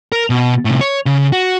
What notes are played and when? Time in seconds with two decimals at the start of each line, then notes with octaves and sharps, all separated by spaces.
0.12 A#4
0.30 B2
0.65 A2 C3
0.81 C#5
1.06 C#3
1.32 F#4